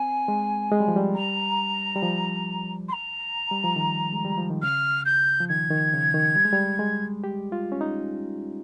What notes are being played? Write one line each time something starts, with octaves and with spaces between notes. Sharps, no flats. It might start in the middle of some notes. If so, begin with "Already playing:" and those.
Already playing: C4 G#5
G#3
G#3
G3
F3
G3
A#5
G3
F3
C6
A#5
G3
F3
D#3
G#3
G3
F3
D#3
C#3 F6
G6
F3
D#3 G#6
D#3
C#3
D#3
G3
G#3
G3
G#3
G4
F4
C#4
D#4